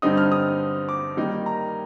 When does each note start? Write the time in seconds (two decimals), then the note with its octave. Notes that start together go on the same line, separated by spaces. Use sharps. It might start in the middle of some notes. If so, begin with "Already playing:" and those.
0.02 G2 D3 G3 C4 D#4 D#6
0.17 F6
0.32 D#6
0.89 D6
1.17 D#3 G3 A#3 D#4
1.46 A#5